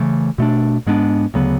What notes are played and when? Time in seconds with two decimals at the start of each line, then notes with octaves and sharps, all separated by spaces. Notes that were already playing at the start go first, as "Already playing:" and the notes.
Already playing: C#3 E3 A3
0.38 B2 A3 D4
0.87 G#2 G#3 B3 D4
1.34 D2 C#3 F#3 B3